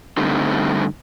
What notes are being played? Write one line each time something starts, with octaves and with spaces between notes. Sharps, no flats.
G2 D3 G3 A3 C4 D#4